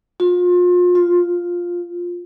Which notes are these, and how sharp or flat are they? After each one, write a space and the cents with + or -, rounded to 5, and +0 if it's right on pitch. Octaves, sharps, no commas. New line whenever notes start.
F4 +35
F4 +5